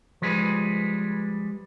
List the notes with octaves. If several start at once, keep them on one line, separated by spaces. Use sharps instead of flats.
F3 G3 G#3 G#4 A#4 B4